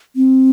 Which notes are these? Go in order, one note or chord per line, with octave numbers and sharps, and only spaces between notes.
C4